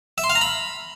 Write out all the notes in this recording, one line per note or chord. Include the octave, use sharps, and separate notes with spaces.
E5
C6
F5
A#5
B5